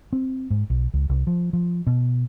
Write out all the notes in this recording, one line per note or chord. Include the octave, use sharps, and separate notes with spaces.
C4
G#2
B1
C#2
C2
F3
F3
B2